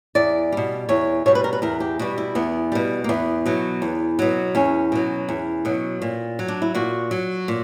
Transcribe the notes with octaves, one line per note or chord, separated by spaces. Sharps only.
E2 D5
B2 G3
E2 C#5
B2 G3 C#5
B4
A#4
B4
E2 A#4
G4
B2 G3 F#4
E4
E2 B3
B2 G3
A#3
E2 B3
B2 F#3
E2
B2 F#3
E2 C#4
B2 F#3
E2
B2 F#3
A#2
F#3
D4
E4
A#2 F#4
F#3
A#2